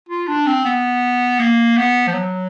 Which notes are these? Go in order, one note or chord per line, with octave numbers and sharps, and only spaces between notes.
F4
D4
C4
B3
A#3
B3
F3
F#3